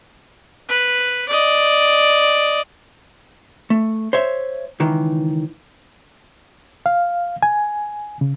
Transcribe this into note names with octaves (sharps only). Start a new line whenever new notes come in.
B4
D5 D#5
A3
C5 C#5 E5
C#2 D#3 E3
F5
G#5
C#3